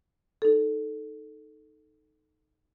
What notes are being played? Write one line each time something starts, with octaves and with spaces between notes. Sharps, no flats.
D#4 A4